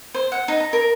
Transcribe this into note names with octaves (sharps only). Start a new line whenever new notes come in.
C5
F#5
D#4
A#5
A#4